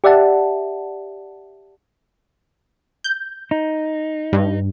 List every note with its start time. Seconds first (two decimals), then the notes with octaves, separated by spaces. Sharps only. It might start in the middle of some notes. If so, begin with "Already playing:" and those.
0.04 G4 D5 E5 F#5 A5
3.04 G6
3.51 D#4
4.33 G2